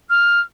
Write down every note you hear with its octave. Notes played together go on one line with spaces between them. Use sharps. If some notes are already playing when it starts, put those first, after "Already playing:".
F6